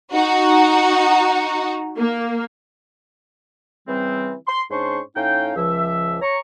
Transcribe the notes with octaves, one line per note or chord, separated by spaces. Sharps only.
D#4 F#4
A#3
C#3 E3 G3 C4
C6
G#2 C#4 D4 C5 C6 C#6
A2 C#4 D#4 F5 G5
C#2 F3 E5
C#5 A#5 C#6